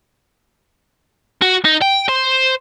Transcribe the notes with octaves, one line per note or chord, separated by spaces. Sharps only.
F#4
D#4
G5
C5